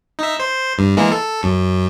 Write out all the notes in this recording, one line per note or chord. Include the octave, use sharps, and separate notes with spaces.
D#4 E5
C5
G2
E3 G#3 A#3
A4
F#2